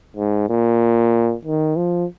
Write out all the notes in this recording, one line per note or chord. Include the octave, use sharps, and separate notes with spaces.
G#2
A#2
D#3
F3